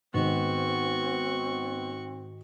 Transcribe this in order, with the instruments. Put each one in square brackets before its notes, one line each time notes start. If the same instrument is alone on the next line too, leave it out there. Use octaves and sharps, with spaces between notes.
[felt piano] G#2 D#3 [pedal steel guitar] B3 [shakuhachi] C4 [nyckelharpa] F#4 C#6